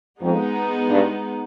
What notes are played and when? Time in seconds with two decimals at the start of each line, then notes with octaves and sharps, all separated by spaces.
0.20 F2 G#3 B3 D#4
0.89 G2